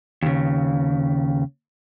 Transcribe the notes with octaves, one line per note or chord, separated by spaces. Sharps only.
D#2 C#3